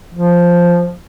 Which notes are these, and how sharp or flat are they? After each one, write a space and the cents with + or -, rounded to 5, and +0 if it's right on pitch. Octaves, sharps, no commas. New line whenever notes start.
F3 +0